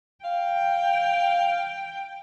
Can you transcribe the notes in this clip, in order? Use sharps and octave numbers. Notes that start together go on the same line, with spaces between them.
F5 G5